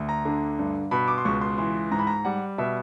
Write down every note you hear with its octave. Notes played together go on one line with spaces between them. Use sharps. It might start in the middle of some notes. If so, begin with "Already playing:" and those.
Already playing: D2
A#5
D3
G2
B2 B5
D6
C6
C#2 C#6
C6
E3 C6
G#2 A#5
B5
A#5
G3 F#5
B2 E5